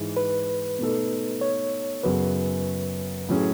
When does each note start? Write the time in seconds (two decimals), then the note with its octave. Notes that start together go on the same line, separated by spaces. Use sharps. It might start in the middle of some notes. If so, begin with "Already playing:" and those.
Already playing: G#2 E3 G#3
0.17 B4
0.79 B2 A3 D#4 A4
1.41 C#5
2.03 F#2 C#3 F#3 B3 F#4 B4
3.28 A2 F#3 C#4 G#4